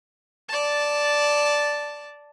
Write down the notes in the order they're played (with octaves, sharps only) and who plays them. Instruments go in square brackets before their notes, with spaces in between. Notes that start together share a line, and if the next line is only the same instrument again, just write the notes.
[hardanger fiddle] D5 A5